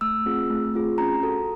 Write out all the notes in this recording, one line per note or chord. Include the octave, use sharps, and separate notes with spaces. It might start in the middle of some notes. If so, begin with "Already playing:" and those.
A3 E6
C4 F4 G#4
A3
C4 F4 G#4
C#4 A#5
F#4 A4